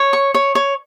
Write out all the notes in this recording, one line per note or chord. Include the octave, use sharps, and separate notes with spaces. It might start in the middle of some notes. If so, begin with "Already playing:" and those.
Already playing: C#5
C#6
C#5
C#5